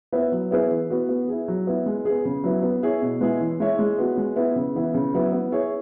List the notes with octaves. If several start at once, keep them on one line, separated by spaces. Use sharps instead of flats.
B3 E4 B4 E5
F#3
B3 E4 G#4 B4
E3
B3 F#4
B3
E4 G#4
F#3
B3 E4
G#3
B3 G#4
C#3
F#3 B3 E4
B3
E4 G#4 C#5
B2
G#3 B3 E4 G#4
E3
G#3 E4 C#5 E5
G#3
B3 F#4
G#3
B3 E4
C#3
E3 B3 E4
C#3
F#3 B3 E4
B3
E4 G#4 C#5